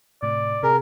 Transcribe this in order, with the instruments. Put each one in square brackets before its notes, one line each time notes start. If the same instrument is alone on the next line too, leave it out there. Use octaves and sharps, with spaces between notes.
[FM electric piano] A2 C3 [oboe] D5
[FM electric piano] C3 G#4 [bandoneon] A#4